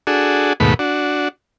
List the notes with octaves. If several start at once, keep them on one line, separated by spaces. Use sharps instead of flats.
D4 F#4 G#4 A4
D#2 G#2 B2 A3 B5
D4 F#4